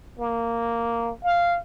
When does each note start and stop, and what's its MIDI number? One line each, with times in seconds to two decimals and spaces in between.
0.19 1.11 58
1.24 1.58 77